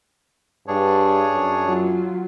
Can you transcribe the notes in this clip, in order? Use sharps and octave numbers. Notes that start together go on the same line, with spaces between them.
G2 D4 G#4 C#5
F#2
F#3 F4